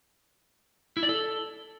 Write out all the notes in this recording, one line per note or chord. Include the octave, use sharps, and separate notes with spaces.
E4
D5
A4